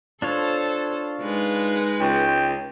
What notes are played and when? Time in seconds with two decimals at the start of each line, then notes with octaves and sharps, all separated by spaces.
0.22 D4 F4 A4 C5 C#5
1.21 G#3 D#4 B4
2.00 C#2 G5